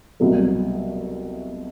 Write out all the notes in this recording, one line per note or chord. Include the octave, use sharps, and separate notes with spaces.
C2 B2 F#3 A3